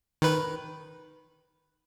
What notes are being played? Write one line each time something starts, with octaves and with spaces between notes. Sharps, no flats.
D#3 B4